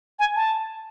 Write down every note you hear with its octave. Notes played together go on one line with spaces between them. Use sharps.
G#5
A5